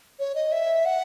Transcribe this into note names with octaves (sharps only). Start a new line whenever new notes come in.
C#5
D#5
E5
F#5